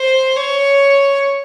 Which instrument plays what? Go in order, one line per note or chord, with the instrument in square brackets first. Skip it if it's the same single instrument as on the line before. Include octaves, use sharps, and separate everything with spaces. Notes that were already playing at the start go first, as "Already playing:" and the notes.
Already playing: [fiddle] C5
C#5